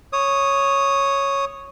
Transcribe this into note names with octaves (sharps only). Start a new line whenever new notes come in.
C#5 D#6